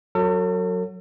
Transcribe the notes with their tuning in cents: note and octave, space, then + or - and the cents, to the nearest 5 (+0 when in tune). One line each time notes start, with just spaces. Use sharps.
F#3 -10 A4 +45